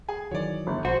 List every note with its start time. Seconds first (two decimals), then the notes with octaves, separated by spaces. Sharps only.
0.08 G#4 G#5
0.31 D#3 E3 F#3 C#5 D5
0.67 G1
0.85 A#1 F#4 C5